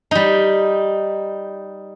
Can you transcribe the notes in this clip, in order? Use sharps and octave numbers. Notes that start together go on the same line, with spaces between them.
G3 D#4